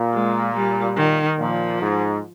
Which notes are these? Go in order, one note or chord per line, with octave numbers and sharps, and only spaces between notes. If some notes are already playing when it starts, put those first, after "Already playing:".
Already playing: A#2
G#3
G3
D#3
A#2 F3
G#2